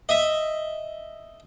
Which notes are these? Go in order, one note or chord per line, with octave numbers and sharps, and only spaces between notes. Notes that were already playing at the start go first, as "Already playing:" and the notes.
D#5 E5